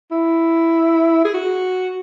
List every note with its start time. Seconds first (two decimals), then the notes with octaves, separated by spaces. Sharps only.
0.11 E4
1.24 G#4
1.34 F#4